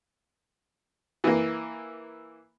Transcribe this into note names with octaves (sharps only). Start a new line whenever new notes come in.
E3 A#3